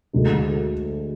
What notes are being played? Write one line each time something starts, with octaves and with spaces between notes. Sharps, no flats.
D2 D3 G#3